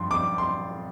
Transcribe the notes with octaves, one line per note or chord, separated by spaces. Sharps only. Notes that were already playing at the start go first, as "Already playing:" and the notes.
Already playing: G2 F3 C6
D6
C6